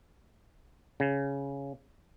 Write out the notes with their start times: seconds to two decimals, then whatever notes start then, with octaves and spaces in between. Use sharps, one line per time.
1.00 C#3